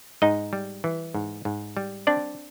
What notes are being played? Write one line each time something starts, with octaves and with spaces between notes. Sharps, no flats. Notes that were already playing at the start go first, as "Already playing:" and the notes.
G#2 D#4 D#5
G3
E3
G#2
G#2
G3
C4 D4 D5